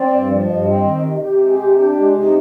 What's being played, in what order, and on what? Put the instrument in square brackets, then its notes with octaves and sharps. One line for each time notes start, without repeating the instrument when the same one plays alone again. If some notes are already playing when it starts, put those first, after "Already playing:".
Already playing: [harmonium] C4 [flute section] D5
[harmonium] G2
F3
[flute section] D5
[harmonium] G2 [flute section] D#5
[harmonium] C4
D#3
C3
[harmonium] C3 [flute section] G4
[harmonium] G#3
C3
D4
G#3
C3
[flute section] D#4